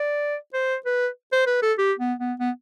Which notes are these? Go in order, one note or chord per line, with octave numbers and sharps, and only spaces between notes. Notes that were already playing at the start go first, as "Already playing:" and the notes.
Already playing: D5
C5
B4
C5
B4
A4
G4
B3
B3
B3